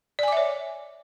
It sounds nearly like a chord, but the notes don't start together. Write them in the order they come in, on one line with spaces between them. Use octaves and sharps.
D5 G#5 D6 E5 C#5